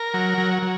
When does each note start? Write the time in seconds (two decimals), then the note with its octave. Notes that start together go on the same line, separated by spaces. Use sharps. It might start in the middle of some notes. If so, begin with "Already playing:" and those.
Already playing: A#4
0.14 F#3
0.38 F#3
0.62 F#3